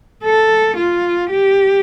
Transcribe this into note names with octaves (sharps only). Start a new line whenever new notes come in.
A4
F4
G4